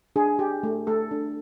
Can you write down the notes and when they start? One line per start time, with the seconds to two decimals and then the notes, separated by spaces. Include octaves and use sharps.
0.16 D4 G#4
0.39 G4
0.63 A3
0.87 A3 A4
1.11 D4